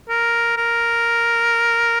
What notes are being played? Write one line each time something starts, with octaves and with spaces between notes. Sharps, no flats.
A#4
A#4